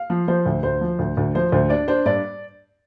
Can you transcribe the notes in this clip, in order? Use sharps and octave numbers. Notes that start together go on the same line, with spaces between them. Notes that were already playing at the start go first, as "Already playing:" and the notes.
Already playing: F5
F3
F3 C5
D2
D2 C5
F3
D2
D2
F3 C5
D2 C5
D4 D5
D4 C5
G2 D5